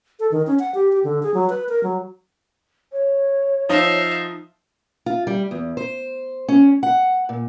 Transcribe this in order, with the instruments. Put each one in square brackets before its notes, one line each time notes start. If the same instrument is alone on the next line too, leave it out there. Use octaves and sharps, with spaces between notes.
[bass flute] A4
D#3
C#4
F#5
G4
G4
D3
G#4
F#3
B4
A#4
F#3
[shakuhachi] C#5
[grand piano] F3 D#4 [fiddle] E5 F5
[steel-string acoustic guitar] F4
G3
E2
C5
C#4
F#5
A#2